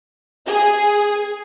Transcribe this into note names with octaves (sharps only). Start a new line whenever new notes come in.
G#4